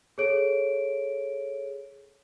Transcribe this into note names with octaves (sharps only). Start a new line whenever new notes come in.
G#4 A4 C#5 D7